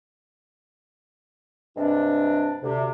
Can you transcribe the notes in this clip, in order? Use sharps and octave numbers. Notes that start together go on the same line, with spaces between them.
G2 C3 G#3 D4
D2 C3